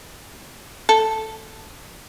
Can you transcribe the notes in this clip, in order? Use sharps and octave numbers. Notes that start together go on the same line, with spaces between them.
A4